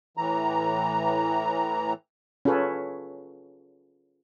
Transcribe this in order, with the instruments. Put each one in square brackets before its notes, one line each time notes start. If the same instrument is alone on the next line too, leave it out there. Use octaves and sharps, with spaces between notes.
[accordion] A2 E3 A#5
[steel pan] C#4 F4 G#4 A4 B4 C#5